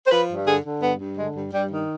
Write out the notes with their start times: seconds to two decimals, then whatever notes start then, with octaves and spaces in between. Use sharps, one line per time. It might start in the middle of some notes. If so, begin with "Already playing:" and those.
0.07 C5
0.12 F3 B4
0.30 G2
0.47 D3 G#4
0.64 D3
0.82 G2 B3
1.00 G2
1.18 D3 G#3
1.36 G2
1.53 G2 G3
1.71 D#3